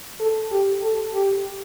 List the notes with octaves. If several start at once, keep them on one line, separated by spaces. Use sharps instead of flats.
A4
G4
A4
G4